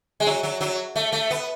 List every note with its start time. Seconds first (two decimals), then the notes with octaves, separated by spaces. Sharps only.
0.20 G#3
0.26 F#3
0.43 F#3
0.61 F#3
0.96 A3
1.12 A3
1.31 B3